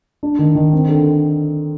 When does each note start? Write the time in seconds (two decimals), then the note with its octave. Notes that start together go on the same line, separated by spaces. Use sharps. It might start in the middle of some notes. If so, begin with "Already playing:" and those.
0.23 D4
0.39 D#3
0.55 D#3
0.73 C4
0.89 D3